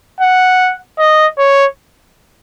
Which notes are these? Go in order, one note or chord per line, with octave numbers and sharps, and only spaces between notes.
F#5
D#5
C#5